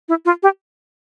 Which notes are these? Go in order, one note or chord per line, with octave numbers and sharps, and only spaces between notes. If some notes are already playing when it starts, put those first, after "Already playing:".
E4
F4
G4